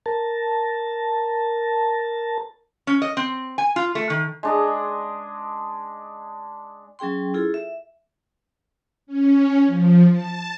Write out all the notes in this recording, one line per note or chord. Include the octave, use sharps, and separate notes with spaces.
A#4 A5
C#4
D#5
C4
G#5
F4
A3
D#3
G#3 D4 D#5
F#3 C#4 G#4 G5 C6
E4 F4 G#4 A4
E5
C#4
F3
A5